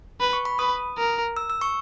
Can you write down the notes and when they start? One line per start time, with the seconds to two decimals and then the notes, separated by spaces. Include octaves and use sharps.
0.20 B4
0.33 C#6
0.45 B5
0.59 B4 D#6
0.98 A#4
1.37 E6
1.50 E6
1.61 C#6